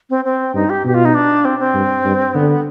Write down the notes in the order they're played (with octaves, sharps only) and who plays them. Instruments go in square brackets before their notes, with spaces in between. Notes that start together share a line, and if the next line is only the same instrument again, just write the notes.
[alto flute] C4
C4
[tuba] G2 [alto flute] D#4
[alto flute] G4
[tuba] B2 [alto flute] G4
[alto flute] F4
D#4
D4
C4
C4
[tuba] G2
G2
[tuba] D3 [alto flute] B3